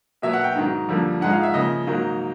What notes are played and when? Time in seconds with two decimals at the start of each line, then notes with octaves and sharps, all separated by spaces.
0.22 B2 F#3 A#3 E5
0.33 F#5
0.44 G5
0.55 G#2 D#3 F#3
0.89 F2 D3 G3 A#3
1.21 G#2 F3 G#3 F#5
1.33 F5
1.43 E5
1.54 C#3 F3 A#3 D#5
1.87 G#2 D#3 F#3 A#3